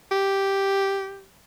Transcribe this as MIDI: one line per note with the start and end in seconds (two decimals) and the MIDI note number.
0.11 1.24 67